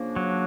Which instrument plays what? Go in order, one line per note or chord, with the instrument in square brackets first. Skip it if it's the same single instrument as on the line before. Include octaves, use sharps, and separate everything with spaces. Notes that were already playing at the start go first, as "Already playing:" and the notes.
Already playing: [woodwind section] C#3 F3 A#3 D4
[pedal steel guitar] F#3